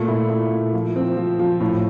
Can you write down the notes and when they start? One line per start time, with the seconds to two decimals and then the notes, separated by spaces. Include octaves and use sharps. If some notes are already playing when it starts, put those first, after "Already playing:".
Already playing: A#2 A3
0.08 E4
0.29 E4
0.51 A#2
0.74 F3
0.96 C4
1.17 F3
1.39 F3
1.60 A2